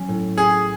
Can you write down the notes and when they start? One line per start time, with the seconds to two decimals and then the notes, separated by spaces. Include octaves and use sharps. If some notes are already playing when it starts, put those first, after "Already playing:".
Already playing: F#3 C#4
0.08 A2
0.37 C#4 G#4